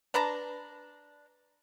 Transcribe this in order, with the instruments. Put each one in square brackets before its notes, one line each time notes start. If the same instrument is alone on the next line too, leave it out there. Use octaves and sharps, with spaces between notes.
[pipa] D4 B4 A5 A#5